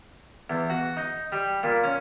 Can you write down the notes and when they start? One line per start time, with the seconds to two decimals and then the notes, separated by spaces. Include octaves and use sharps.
0.50 E2
0.70 F#4
0.97 D#4
1.32 G3
1.63 A#2
1.84 C#4